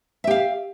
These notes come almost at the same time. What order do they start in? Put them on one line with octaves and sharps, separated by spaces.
E5 G4 F5